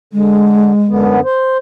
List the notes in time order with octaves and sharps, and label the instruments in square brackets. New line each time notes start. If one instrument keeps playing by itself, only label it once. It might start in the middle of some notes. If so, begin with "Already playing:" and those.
[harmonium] D3 [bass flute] G#3
[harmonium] F#2 D3 B3
C5